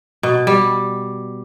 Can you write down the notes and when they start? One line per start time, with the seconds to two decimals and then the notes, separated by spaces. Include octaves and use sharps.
0.23 B2
0.47 G3